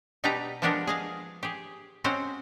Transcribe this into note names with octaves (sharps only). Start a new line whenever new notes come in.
B2 G3 D#4 G4 B4 A#5
F3 G#3 B3 D4 G4 A#4
G#4 D#5 F5
G4 G#4
G#3 C4 C#4 F#4 C5